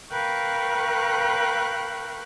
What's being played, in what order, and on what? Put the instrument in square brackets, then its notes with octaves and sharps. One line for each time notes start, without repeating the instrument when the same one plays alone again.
[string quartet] A#4 B4 F5 G5 C#6 F#6